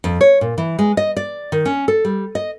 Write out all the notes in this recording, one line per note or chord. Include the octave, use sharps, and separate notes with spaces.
F2
C#5
A#2
E3
G#3
D#5
D5
D#3
C#4
A4
G3
D#5